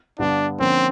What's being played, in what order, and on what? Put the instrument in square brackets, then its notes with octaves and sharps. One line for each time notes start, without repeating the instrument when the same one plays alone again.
[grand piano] G2 D3 G3 B3 [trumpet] D4
[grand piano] D3 F3 A#3 C#4 [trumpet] C4